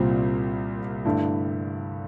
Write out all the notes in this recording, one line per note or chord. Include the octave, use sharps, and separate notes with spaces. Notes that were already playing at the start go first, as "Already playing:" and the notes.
Already playing: C2 A#2 G3 C4 F4
G2 D3 A3 E4